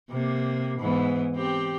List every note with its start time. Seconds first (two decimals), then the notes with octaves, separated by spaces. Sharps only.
0.11 C3 A#3
0.79 G#2 E3 B3
1.35 C4 G4